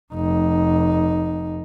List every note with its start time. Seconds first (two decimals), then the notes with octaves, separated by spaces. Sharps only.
0.14 F1 D#4